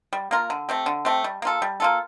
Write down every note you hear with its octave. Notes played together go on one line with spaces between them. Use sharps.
G3
A#3 F4 A#4
D3
A3 C4 G4
D3
A3 C4 G4
G3
A#3 F4 A4
G3
A#3 F4 A4